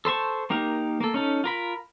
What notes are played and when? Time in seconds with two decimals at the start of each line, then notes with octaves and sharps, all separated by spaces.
0.05 A4 C5 A5 C#6
0.50 A#3 D#4 G4 A#4
1.00 A#3 A4
1.14 C#4 D#4 A4
1.44 F4 A#4 B5